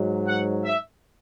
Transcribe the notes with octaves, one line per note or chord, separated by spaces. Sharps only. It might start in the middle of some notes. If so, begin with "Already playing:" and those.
Already playing: G#2 F#3
F#5
E5